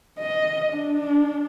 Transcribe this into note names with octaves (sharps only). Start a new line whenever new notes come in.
D#5
D4